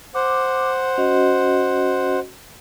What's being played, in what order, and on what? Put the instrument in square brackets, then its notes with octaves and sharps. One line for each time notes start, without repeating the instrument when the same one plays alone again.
[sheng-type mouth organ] C5 F#5 [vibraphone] D6
[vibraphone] C#4 F#4 D#5